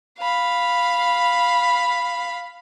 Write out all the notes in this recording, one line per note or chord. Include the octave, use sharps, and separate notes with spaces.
F5 B5